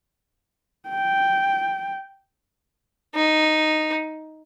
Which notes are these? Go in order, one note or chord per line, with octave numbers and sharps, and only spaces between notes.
G5
D#4